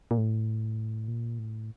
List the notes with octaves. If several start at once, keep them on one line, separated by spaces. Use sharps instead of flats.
A#2
A2
A#2
A2